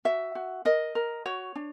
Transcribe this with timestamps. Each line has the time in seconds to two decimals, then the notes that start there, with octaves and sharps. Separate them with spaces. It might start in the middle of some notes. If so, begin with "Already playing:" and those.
0.05 F#4 E5
0.35 F#4
0.65 A#4 D#5
0.95 A#4
1.26 F#4 C#5
1.55 D4